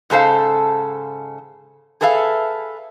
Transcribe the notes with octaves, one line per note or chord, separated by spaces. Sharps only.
G#2 C#3 A4 C5 F5
G#4 A4 B4 E5 F5